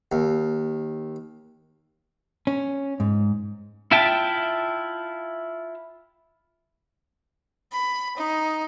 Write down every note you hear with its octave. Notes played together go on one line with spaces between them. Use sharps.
D#2
C#4
G#2
E4 F4 E5 G5 A5
B5
D#4